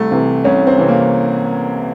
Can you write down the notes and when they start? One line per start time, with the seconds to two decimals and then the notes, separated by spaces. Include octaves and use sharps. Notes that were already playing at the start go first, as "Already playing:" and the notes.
Already playing: C2 A3
0.11 C3 E3
0.44 C2 C#4
0.67 C4
0.78 C3 E3
0.89 A#3